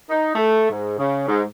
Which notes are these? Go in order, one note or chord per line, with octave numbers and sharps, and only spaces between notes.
D#4
A3
G#2
C#3
G#2